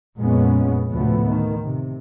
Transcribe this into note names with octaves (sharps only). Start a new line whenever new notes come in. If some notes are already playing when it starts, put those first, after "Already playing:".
F2 A#2 G#3 B3 C#4
D2 A2 C3 F3 A3 B3
D#3
C3